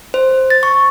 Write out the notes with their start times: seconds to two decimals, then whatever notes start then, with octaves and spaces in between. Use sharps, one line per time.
0.14 C5
0.50 A6
0.63 C#6